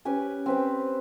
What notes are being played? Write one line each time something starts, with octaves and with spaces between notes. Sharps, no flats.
C#4 G4 B4 G#5
C4 B4 G5